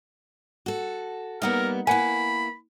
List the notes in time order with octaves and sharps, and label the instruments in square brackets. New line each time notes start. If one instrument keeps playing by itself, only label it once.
[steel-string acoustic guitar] F#4 A4
[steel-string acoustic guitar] G3 A#3 B3 [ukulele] D#4 F#5 [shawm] A#4
[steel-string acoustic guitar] A#3 E4 [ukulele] F#5 G#5 [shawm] B5